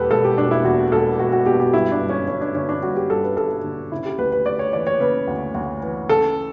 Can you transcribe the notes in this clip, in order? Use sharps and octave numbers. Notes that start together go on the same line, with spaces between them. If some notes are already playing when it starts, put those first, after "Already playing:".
Already playing: E1 E2 G4 A4 B4
E1 A4
G4
B2 D4
E4
E2 F#4
E1 A4
E1 F#4
F#4
B2 G4
G4
G2 E4
D4
G1
C#4
G1 C#4
D4
D3 C#4
D4
G2 F#4
G4
G1 A4
B4
G1 A4
D3
C#3 E4
G4
D2 B4
B4
D2 D5
C#5
E3 D5
C#5
C#3 B4
D2
D2
E3
C#3 A4